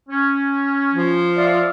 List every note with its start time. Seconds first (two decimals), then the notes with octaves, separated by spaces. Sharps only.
0.09 C#4
0.94 F3
1.37 D5 E5 F5